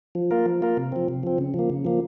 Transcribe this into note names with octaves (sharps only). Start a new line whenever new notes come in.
F3
A#3 F4 A#4
F3
A#3 F4 A#4
C3
F3 C4
C3
F3 C4
C#3
F3 A#3
C#3
F3 A#3